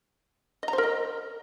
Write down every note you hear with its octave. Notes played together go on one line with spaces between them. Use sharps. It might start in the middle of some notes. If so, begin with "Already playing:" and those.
D#5
A#5
C5
A#4
D#5